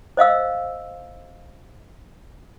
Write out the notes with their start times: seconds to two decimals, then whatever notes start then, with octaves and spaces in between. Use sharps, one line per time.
0.17 C5 D#5 F5 E6